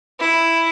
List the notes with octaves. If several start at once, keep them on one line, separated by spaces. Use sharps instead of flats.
E4